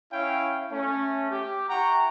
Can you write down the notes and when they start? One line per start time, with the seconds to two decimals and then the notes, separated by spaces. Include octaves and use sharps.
0.13 C#4 E4 C#5 F5 G5
0.71 A3 C#4
1.31 G4
1.69 E4 F#5 G5 A#5 C#6